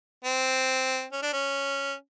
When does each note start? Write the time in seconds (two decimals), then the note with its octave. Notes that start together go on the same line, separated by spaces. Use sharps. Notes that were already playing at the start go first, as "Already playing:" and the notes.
0.25 C4
1.12 C#4
1.23 D4
1.33 C#4